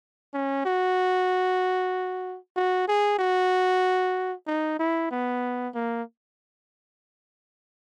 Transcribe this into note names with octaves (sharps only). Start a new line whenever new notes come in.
C#4
F#4
F#4
G#4
F#4
D#4
E4
B3
A#3